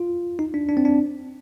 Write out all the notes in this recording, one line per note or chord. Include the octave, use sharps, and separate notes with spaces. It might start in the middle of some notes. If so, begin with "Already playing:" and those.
Already playing: F4
D#4
D4
D4
C4
D4